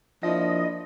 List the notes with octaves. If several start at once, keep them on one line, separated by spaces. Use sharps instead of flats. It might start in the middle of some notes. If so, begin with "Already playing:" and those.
F3 A#3 D4 E4 D#5